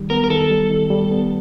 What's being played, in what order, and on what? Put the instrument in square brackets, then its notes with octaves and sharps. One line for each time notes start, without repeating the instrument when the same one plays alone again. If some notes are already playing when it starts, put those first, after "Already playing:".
Already playing: [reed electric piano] D#3 G3
[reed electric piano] B3 [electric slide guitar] A#4
[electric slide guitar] A#4
[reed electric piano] D#3 [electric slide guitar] A4
[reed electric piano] G3
D#3
G3
B3